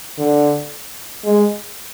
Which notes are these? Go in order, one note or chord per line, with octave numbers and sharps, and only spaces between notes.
D3
G#3